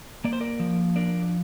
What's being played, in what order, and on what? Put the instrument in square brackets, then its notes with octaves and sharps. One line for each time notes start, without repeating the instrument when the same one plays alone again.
[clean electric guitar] A#3 D5
C5
A#4 D5
F3
D4 A#4 D5